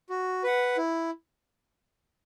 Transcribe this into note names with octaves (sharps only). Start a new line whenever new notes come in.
F#4
B4 F#5
E4